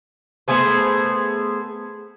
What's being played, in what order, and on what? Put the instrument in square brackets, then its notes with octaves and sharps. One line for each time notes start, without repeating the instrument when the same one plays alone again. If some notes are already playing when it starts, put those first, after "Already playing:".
[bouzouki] A3 B3 G#4 C5